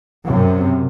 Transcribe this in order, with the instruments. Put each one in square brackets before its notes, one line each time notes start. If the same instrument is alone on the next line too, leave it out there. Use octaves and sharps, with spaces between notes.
[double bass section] F#2 C3